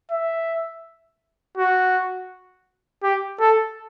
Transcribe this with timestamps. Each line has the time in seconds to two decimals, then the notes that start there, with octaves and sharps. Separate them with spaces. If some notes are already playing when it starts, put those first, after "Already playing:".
0.11 E5
1.57 F#4
3.03 G4
3.40 A4